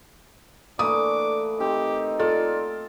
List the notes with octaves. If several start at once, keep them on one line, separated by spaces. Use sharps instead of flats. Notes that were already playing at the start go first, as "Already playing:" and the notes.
E3 A3 A#3 D4 D6 D#6
C4 D#4 G4
F4 A4 D5 D#5